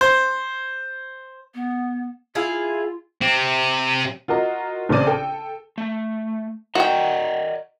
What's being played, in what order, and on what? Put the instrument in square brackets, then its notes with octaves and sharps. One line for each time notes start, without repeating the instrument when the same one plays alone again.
[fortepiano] C5
[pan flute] B3
[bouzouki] E4 G#4 F5 [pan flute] F4
[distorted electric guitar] C3 C4
[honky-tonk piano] F4 F#4 A#4 D#5
A#1 C#3 C4 C5 D5 D#7
A4 G5
[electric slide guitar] A3
[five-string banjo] F#4 G5 [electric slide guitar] A#4 D5 D#5